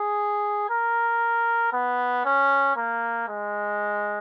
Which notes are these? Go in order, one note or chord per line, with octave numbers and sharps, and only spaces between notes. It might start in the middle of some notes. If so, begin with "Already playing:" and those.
Already playing: G#4
A#4
B3
C#4
A#3
G#3